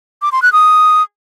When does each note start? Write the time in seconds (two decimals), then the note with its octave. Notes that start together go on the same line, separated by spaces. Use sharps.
0.22 D6
0.32 C6
0.42 F#6
0.53 D#6